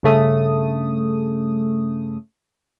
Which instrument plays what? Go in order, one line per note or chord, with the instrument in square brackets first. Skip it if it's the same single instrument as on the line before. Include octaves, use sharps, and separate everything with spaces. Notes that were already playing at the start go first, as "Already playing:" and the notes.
[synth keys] G2 C#3 A3 D#6